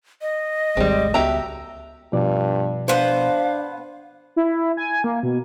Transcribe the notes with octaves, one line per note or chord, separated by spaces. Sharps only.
D#5
G#1 D#2 D#3 G3 G#3 C4
C#2 B3 F#4 G4 E5 A#5
G2 B2 F3 D5
B3 D4 C5 F5
E4
G#5
A#3
B2